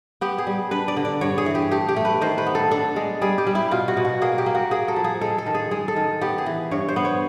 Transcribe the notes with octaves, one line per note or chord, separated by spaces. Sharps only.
B3 G4
G#4
G3
D4 B4
D5
D3
D5
G2 C#5
G#4
E3
G4
A3 G4
G4
A3
B4
D#3 C5
B4
B3
A4
D4 A4
G#3
G3 G#4
G4
G3
E4
B2 F4
F#4
B2
F#4
A#3 G#4
G4
A#3
F#4
A#3 G#4
A4
F3
G#4
G#3 A4
A4
D#3
G#4
G#3 G#4
A4
D#3
B3 G4
G#4
E3
G2 C#5
C5
B3
C#5